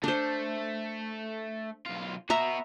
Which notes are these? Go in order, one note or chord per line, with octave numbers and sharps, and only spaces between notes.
A3 D4 C5
B1 F4
B3 F#4 E5 A#5